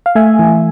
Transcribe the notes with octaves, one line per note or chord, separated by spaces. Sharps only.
F5
A3 E5 G#5
E3